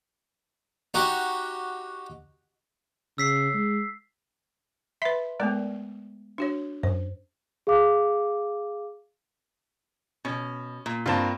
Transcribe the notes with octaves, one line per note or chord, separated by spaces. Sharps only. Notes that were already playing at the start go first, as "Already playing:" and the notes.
D#4 F#4 G4
C#3 E6 B6 C7
G#3
B4 E5 B5 C6 B6
G#3 A3 B3 A#4 D5
D4 F#4 C#5
F#2 C5
G#4 F5 D6
B2 C#4
A#2
G2 A#3 C4 F4 A5